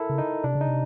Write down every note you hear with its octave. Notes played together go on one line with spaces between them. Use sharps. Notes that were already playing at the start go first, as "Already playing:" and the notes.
Already playing: E4 A4 A#4
C#3
D#4
C3 D4
C#3
D#4
C3